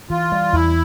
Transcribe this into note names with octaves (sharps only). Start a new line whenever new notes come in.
E3 F4
G3
E2 E4